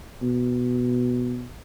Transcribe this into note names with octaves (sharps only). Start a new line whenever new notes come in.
B2